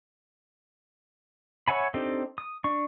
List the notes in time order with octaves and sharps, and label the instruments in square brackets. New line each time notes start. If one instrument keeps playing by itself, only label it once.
[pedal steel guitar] C#5 E5 F#5 G#5 B5
C4 D4 D#4 G4 A4
D#6
D4 C#6